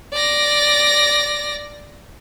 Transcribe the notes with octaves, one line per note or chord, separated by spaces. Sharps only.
D5 A#6